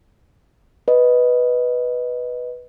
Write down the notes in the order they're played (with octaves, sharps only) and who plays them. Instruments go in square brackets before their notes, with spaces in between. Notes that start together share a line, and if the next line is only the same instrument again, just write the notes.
[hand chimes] B4 D#5